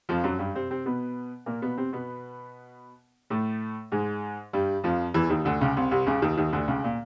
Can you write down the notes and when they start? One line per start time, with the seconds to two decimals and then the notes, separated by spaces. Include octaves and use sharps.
0.09 F2 F3
0.24 F#2 F#3
0.39 G2 G3
0.55 C3 C4
0.70 C3 C4
0.86 B2 B3
1.46 A#2 A#3
1.62 B2 B3
1.77 C3 C4
1.93 B2 B3
3.30 A2 A3
3.92 G#2 G#3
4.53 G2 G3
4.84 F2 F3
5.14 E2 E3
5.30 D#2 D#3
5.45 D2 D3
5.61 C#2 C#3
5.77 C2 C3
5.91 C2 C3
6.07 C#2 C#3
6.22 D#2 D#3
6.37 D#2 D#3
6.53 D2 D3
6.68 C#2 C#3
6.84 A#2